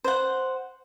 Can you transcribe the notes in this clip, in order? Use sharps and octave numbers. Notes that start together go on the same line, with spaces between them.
C5 F#5